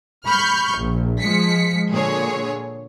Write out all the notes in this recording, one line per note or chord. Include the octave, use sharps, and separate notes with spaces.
B5 C#6 F6 G6
A#1
F3 G#3 B6 C#7
A#2 D3 G#4 C#5